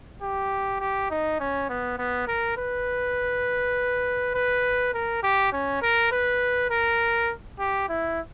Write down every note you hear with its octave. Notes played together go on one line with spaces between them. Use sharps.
G4
G4
D#4
C#4
B3
B3
A#4
B4
B4
A#4
G4
C#4
A#4
B4
A#4
G4
E4